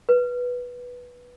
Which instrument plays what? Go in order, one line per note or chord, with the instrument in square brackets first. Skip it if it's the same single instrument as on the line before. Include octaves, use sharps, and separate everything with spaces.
[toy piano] B4